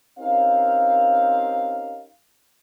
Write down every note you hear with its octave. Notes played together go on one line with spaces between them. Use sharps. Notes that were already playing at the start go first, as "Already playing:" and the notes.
C4 C#4 D#4 G4 A#4 F5